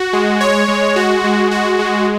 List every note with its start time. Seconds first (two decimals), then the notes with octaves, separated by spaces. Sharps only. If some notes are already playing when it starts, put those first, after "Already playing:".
Already playing: F#4
0.13 G#3
0.41 C#5
0.68 G#3
0.96 F#4
1.24 G#3
1.51 F#4
1.79 G#3